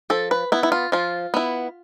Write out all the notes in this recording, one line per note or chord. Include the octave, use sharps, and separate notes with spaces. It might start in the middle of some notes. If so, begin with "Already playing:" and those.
F3 A4
B4
B3 E4
E4
F4
F3 F4
B3 E4